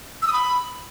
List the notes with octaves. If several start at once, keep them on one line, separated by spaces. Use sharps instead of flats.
E6
D#6
B5